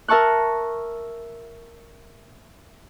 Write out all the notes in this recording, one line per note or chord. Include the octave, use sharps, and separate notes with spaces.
A#4 E5 A5 C#6 F#6